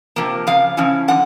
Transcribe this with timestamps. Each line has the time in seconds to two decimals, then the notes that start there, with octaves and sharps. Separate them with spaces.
0.16 C3 F3 A#3
0.47 C#3 F3 F5
0.77 C#3 F3 C#4 E4
1.08 D3 F3 F#5